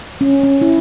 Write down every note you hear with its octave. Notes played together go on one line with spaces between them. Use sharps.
C#4
C#4
E4